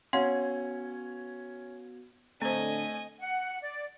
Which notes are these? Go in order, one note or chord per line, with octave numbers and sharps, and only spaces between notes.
B3 C#4 F#4 F5 F#5 C6 G#6
A2 D3 A3 C4 C5 D#5 G#5
F#5
D5